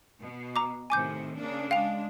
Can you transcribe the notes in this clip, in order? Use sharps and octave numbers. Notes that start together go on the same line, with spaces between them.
B2
A#5 D6
A2 C3 D#3 G#5 D6 G6
C#3 A#3 D4
G#3 D4 F5 G5 F7